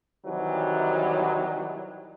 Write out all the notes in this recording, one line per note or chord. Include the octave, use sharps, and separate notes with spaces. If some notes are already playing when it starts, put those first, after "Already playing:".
C3 D#3 E3 F#3 G3